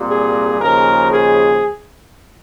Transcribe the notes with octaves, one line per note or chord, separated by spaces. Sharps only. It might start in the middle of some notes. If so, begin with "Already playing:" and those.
Already playing: C2 A#2 G3
G#4
D#2 C#3 F3 G#3 A#4
G#4